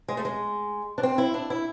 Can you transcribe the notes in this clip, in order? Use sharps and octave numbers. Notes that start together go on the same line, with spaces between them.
G#3
A3
G#3
D4
C4
E4
D4
E4